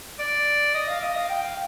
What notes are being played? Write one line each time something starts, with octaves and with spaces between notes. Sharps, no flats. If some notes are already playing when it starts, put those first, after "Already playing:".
D5
D#5
F5
D#5
F5
G5
F5